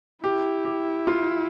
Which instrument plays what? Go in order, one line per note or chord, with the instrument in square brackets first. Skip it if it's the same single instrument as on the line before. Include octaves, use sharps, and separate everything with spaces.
[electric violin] E4 [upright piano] G4
[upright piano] G4
F4